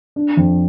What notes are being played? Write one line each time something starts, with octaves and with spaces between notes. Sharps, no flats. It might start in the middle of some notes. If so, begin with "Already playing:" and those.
D4
F2